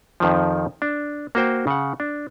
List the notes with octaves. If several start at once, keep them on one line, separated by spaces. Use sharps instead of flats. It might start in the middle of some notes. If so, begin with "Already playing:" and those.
F2 D#3 F3
D4
A#3 F#4 C5 G5
C#3 F#5
D4